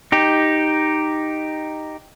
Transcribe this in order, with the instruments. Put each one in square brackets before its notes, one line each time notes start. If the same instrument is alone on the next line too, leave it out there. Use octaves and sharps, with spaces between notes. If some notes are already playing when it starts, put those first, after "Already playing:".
[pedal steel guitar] D#4 G4